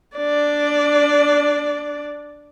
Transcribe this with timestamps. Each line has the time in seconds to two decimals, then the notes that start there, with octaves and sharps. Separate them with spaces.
0.17 D4 D5